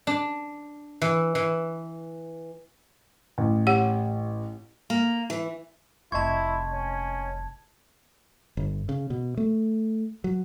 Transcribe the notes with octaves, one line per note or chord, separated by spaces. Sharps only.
D4
E3
E3
A1
G4 C#5 F#5
A#3
E3
F1 C3 E4 D#5 A5 C6 C#6 G#6
C#4
G1
C#3
B2
A3
F#3